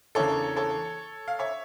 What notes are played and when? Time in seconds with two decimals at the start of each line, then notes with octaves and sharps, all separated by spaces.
0.15 E2 C#3 E3 A#3 D4 A4 C#5
0.56 A4 C#5
1.28 F5
1.39 C#5 E5